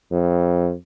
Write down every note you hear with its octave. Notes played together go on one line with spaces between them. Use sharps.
F2